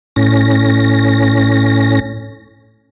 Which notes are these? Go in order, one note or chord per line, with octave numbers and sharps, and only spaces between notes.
A2 C#4 A#6